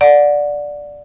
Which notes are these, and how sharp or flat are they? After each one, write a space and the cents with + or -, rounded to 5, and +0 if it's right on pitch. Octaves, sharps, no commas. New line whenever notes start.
D5 +0 F#5 -25